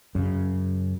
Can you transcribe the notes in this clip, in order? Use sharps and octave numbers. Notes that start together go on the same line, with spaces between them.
F#2 C#3